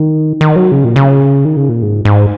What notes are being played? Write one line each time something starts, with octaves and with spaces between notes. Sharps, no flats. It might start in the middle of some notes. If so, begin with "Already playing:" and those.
Already playing: D#3
D#3
F#3
C#3
A#2
C#3
D#3
C#3
A#2
G#2
G#2